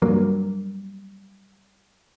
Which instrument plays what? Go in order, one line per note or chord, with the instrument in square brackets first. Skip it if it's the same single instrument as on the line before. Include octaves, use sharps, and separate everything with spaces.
[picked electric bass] G2 F#3 A#3